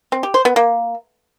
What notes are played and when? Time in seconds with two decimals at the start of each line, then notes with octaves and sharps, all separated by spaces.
0.12 C4
0.23 G4
0.34 C5
0.45 B3
0.56 A#3